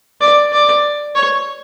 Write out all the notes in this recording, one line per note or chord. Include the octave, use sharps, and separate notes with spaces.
D5
D5
C#5